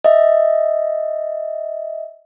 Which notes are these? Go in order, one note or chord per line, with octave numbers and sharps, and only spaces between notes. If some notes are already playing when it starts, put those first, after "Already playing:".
D#5 E5